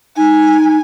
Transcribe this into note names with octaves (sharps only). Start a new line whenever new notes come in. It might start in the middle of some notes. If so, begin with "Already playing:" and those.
D#4 G#5